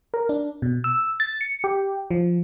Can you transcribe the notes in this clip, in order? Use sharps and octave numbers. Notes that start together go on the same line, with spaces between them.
A#4
D4
B2
E6
A6
C#7
G4
F3